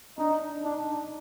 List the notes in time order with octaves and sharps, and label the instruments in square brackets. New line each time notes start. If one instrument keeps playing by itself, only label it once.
[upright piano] D4 [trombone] D#4
[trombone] D4 [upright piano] D#4